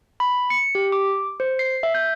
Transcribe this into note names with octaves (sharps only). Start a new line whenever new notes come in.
B5
C#7
G4
D6
C5
C7
E5
G6